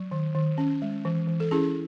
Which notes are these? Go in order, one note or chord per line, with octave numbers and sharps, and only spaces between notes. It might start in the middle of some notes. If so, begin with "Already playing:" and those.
Already playing: F#3
D#3
D#3
C#4
G#3
E3
E3
A4
C#4 E4 G#4